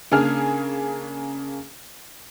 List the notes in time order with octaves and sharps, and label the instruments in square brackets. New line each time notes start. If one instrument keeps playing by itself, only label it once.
[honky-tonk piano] C#3 A#3 D4 G#4 F6